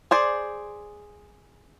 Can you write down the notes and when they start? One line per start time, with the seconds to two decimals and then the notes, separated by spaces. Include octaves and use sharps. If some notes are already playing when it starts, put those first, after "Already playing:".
0.11 G#4 C5 D5